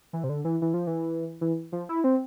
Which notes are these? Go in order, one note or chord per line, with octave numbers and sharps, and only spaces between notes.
E3
C3
D3
E3
E3
F3
E3
E3
F3
E4
C4